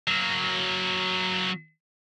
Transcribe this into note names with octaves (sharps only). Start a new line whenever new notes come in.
F#3 A#3